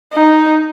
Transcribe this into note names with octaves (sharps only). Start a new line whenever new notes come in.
D#4